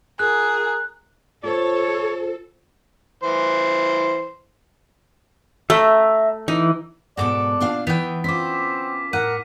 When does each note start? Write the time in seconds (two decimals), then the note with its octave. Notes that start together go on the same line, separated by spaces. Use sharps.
0.19 F4 G#4 A#4 F#6
1.44 F4 A4 C5 C#5
3.23 E3 C5
5.70 A3 E5 A#5
6.48 E3 D#4
7.17 G#2 B2 F#4 A4 D5 D6
7.60 A#2 D4 F5
7.87 E3 B3 G5
8.24 C4 C#4 F4 D6 B6
9.13 A2 A#4 F#5 D#7